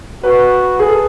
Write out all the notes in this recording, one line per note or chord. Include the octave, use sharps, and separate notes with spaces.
F#4 B4
G#4
A4